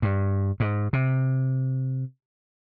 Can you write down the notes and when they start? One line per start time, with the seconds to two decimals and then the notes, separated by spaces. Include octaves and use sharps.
0.02 G2
0.60 G#2
0.93 C3